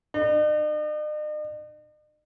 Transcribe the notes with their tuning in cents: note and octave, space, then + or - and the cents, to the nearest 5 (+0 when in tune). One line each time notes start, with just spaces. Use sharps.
D#4 -45